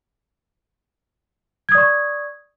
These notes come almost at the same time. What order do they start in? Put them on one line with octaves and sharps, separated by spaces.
G#6 D#6 D5 C#6